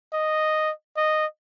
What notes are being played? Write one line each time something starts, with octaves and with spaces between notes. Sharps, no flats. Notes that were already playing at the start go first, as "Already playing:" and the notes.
D#5
D#5